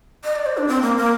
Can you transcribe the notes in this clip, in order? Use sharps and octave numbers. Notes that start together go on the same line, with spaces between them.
D#5
D5
C5
D4
C4
A#3
A#3